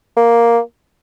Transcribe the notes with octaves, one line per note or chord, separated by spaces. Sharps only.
A#3